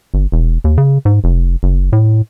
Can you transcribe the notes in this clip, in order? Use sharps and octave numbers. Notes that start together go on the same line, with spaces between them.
G1
E1
D#2
C#3
G#2
F1
F#1
A2